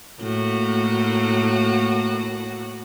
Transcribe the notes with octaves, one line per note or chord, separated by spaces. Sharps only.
A2 A#3 F#4